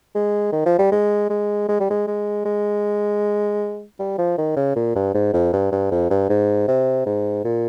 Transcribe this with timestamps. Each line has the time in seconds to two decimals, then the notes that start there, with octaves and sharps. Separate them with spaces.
0.15 G#3
0.52 D#3
0.66 F3
0.79 G3
0.92 G#3
1.30 G#3
1.68 G#3
1.80 G3
1.90 G#3
2.07 G#3
2.45 G#3
3.99 G3
4.18 F3
4.38 D#3
4.56 C#3
4.76 A#2
4.95 G2
5.14 G#2
5.34 F2
5.53 G2
5.72 G2
5.91 F2
6.10 G2
6.29 G#2
6.68 C3
7.06 G#2
7.45 A#2